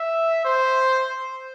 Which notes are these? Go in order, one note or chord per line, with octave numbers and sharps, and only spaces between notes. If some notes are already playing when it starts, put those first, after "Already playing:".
Already playing: E5
C5